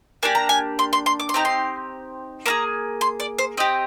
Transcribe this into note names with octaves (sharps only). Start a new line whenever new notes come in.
A#3 D4 G4 G#5
A#5
G#5
C6
C6
C6
D6
C6
C4 D#4 G4 A#5
C6
A#3 F4 G#4 A#5
C6
D5
C5
C4 G4 D#5